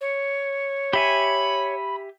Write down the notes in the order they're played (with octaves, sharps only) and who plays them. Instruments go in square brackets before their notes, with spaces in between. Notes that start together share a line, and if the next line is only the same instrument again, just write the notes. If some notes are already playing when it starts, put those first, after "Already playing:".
[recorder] C#5
[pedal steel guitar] G4 E5 G#5 [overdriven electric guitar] B5